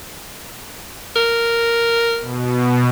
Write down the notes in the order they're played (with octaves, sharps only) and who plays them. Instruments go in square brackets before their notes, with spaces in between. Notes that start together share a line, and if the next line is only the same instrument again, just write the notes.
[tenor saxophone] A#4
[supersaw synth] B2